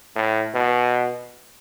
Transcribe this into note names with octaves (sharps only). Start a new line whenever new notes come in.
A2
B2